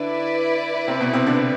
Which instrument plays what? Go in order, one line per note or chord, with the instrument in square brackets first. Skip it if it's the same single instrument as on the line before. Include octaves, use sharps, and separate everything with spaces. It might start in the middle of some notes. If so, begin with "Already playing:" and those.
Already playing: [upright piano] D3 D4 [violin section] E4 B4 D5
[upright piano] C3 C4
B2 B3
C3 C4
D3 D4